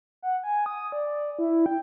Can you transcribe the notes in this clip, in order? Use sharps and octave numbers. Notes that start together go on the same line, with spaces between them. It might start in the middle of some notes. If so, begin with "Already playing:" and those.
F#5
G#5
D#6
D5
E4
G5